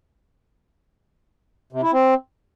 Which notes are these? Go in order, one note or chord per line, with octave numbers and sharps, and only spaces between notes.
C3
E4
C4